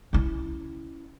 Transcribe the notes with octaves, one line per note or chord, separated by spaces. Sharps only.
C#4 E4